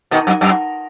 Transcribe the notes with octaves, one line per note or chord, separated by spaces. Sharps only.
B2 D#3
F#2
F#2